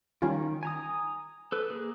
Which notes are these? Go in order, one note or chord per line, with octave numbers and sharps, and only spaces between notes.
D#3 G3 C#4 F4
G#5 A#5 D#6
A4 B4
A#3 G#4